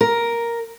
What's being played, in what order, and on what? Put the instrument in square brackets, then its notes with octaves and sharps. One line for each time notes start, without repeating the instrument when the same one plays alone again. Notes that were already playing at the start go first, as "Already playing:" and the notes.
[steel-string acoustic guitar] A#4